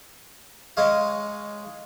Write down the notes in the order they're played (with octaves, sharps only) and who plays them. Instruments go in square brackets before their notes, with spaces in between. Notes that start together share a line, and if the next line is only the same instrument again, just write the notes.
[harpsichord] G#3 C#5 D#5 F5